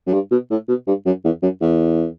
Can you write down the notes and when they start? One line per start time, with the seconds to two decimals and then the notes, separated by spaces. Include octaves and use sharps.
0.07 F#2
0.13 G2
0.31 B2
0.51 A2
0.68 B2
0.87 G2
1.06 F#2
1.25 E2
1.43 F#2
1.62 E2